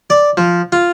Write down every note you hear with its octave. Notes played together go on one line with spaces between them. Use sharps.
D5
F3
F4